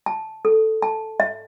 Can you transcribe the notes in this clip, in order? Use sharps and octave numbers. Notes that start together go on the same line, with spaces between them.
A5
A4
A5
E5